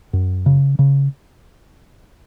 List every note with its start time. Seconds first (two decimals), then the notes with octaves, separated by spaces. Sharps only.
0.13 F#2
0.46 C#3
0.79 C#3